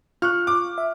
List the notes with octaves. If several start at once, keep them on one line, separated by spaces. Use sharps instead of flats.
F4 C#6 F6 F#6
D6
E5